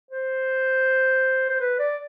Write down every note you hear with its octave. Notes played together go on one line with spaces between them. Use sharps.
C5
C5
B4
D5